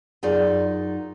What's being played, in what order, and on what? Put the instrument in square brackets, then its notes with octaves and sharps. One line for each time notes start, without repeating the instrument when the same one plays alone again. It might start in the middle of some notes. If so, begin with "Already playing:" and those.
[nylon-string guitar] F#2 D#4 F4 G#4 D5